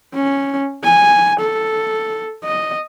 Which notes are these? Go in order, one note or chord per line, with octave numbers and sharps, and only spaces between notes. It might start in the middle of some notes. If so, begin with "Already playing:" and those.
C#4
G#5
A4
D#5